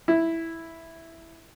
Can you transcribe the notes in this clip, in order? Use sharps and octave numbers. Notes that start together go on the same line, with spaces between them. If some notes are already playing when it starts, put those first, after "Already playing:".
E4